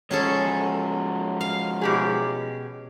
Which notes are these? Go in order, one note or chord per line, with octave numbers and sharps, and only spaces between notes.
F3 F#3 G#3 C#4 G#4 A4
F5
B2 G4 G#4